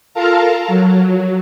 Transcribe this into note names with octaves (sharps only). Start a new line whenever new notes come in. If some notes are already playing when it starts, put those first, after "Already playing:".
F4 A4 A#4 F5 A5 A#5
F#3